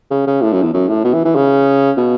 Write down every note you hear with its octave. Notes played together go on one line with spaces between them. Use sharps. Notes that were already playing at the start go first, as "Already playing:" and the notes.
C#3
C#3
A2
F#2
E2
F#2
A2
B2
E3
E3
C#3
B2